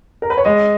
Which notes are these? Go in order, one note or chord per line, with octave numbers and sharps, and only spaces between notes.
A#4
B4
C#5
G#3 D#5